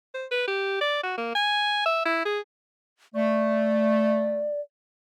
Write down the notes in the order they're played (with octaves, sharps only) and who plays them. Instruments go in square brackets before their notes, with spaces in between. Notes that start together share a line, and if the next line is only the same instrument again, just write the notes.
[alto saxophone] C5
B4
G4
D5
F#4
A#3
G#5
E5
E4
G#4
[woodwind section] A3 [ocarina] D5